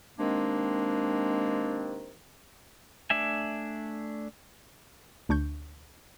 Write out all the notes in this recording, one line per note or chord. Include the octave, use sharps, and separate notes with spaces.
C3 D#3 G#3 A#3 C4 D4
A3 D4 E5 G#5
D2 D4 C#6 G6